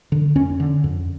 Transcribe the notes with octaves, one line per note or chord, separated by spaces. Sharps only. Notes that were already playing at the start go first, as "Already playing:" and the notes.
D3
F2 C#4
D3
F2